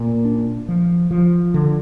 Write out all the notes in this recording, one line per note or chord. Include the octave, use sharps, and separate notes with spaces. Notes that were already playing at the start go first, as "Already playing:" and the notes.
Already playing: A#2
D4
F3
F3
D3